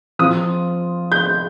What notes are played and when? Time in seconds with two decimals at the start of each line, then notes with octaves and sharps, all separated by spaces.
0.19 F3 C4 F4 D#6
1.12 G6